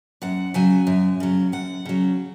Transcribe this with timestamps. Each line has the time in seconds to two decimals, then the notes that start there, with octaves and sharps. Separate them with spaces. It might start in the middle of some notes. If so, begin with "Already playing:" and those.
0.22 F#2 F#5
0.54 C#3 F#3 G#5
0.87 F#2
1.20 C#3 F#3
1.52 F#2 F#5
1.85 C#3 F#3